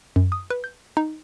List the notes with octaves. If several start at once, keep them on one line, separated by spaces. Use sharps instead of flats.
F#2
D#6
B4
G6
D#4